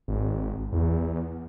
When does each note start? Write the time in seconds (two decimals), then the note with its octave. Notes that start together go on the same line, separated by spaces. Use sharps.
0.08 G#1
0.73 E2